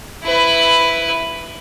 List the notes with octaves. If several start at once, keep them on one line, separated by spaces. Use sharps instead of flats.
E4 B4